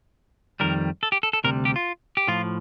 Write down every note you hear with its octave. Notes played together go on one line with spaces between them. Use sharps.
F2 D#3 G3 A#4
A4
G4
A4
A4
D2 C3 G3 A#4
G4
F4
G4
A2 F3 F4